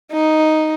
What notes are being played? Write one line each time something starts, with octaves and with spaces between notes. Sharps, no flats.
D#4